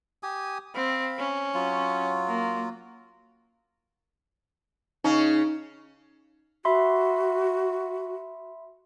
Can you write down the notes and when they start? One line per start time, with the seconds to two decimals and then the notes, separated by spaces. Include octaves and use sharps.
0.23 G4 G#5 D#6
0.75 C4 F5 B5
1.19 C#4
1.54 F#3 F4
2.28 A#3
5.04 C#3 C#4 D#4
6.65 F#4 E5 B5 C6